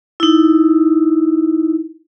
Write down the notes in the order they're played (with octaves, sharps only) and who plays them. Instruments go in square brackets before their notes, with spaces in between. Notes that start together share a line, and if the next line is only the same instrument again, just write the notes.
[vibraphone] D#4 E4